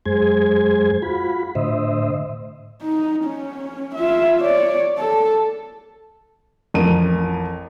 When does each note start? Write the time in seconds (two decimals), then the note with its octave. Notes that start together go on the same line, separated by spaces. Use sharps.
0.06 F#2 G#3 G#4 C5 G#6
1.02 F4 F#4 B5
1.55 A2 D3 C5 D#5 E5
2.83 D#4
3.25 C#4
3.95 F4 E5
4.40 C#5 D5
4.98 A4
6.74 A1 F2 A#4 D#7